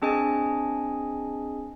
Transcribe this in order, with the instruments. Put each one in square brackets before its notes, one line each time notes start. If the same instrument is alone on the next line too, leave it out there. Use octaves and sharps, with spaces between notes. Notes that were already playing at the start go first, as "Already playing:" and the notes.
[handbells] C4 D4 G#4 D#5 G#5